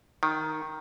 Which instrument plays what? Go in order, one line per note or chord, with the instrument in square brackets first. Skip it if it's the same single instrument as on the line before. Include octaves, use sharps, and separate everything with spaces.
[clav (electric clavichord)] D#3